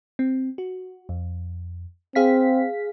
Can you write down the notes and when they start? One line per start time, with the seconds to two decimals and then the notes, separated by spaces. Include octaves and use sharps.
0.19 C4
0.58 F#4
1.09 F2
2.15 C4 G#4 F5 B6